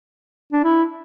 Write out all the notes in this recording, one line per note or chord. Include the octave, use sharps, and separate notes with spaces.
D4
E4